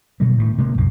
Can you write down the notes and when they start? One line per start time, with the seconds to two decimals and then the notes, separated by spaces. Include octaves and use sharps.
0.20 B2 D3 F#3 G3
0.38 A2 D#3
0.58 C3 G#3 A#3
0.77 C2 F#2 A#2